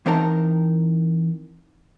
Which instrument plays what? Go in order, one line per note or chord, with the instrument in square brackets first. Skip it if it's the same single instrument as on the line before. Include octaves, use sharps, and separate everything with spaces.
[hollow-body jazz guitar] E3 C4 D#4 A#4 A5 A#5